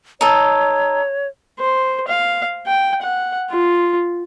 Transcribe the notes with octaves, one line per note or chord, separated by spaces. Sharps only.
D#4 A4 C#5
C5
F5
G5
F#5
F4